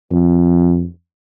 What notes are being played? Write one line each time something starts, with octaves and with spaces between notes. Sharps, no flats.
F2